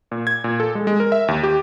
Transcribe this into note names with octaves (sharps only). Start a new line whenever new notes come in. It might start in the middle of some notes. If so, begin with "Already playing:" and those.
A#2
G#6
A#2
A4
G#3
G#3
A#4
E5
D#2
G4